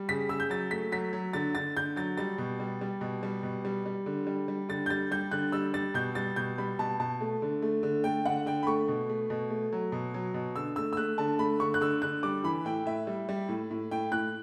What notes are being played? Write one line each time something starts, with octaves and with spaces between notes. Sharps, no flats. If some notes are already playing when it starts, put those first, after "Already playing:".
Already playing: G3
C#3 B6
C#3 E6
G6
F#3 A6
A3 B6
F#3 B6
F#3
D3 A6
D3 A6
D3 G6
F#3 A6
G3 A6
B2
G3
G3
B2
G3
B2
G3
G3
D3
G3
G3
D3 A6
G6
G3 A6
G3 G6
D3 F#6
G3 E6
G3 A6
B2 G6
G3 A6
B2 G6
G3 B5
B2 A5
B2 A5
A3
D3
A3
D3
A3 G5
D3 F#5
D3 G5
B5
A3 C#6
B2
A3
B2
A3
F#3
B2
F#3
B2
D3 E6
A3 E6
E6
A3 F#6
D3 A5
A3 B5
D3 C#6
F#6
D3 E6
D3 F#6
G3 D6
E3 B5
A2 G5
A2 E5
G3
G3
A2
A2
A2 G5
A2 F#6